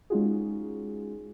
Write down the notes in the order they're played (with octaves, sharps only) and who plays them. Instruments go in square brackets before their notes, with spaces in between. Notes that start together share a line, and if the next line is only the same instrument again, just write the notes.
[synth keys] G#3 C#4 D#4 F4 F#4 G#4